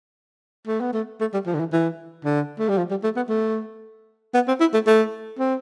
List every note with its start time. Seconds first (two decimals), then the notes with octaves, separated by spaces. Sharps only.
0.67 A3
0.80 B3
0.93 A3
1.20 A3
1.33 G3
1.46 F3
1.54 D3
1.59 E3
1.72 E3
2.24 D3
2.59 A3
2.69 G3
2.78 F3
2.90 G3
3.03 A3
3.16 B3
3.29 A3
4.34 B3
4.48 C4
4.60 E4
4.73 A3
4.87 A3
5.39 C4